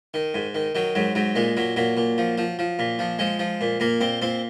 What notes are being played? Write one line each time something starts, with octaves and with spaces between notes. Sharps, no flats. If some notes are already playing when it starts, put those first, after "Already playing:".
D#3
G#2
D#3
D#3 F#3
G#2 F#3
G#2 F#3
A#2 G#3
A#2 F#3
A#2 F#3
A#2
F3
F3
F3
A#2
F3
F3 G#3
F3
A#2
A#2 A#3
A#2 C4
A#2 C4